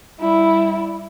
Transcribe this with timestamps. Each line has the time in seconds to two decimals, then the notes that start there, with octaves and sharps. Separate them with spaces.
0.21 G3 E4